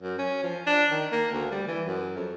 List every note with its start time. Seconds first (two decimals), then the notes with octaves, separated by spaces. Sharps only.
0.02 F#2
0.18 C#4
0.43 F3
0.67 D4
0.91 D#3
1.12 A#3
1.32 D2
1.51 G3
1.67 E3
1.86 F#2
2.16 F2